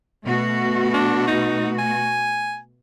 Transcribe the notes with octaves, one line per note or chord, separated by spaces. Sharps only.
B2 A3 F#4
D4
D#4
G#5